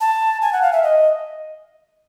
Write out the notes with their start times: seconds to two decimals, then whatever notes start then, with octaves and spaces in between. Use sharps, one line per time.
0.01 A5
0.42 G#5
0.53 F#5
0.62 F5
0.73 E5
0.83 D#5